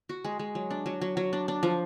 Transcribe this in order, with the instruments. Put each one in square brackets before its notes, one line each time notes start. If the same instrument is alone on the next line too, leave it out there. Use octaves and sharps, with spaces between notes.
[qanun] F#4
G#3
G#3
F#3
D4
F#3
F#3
F#3
D4
D4
F3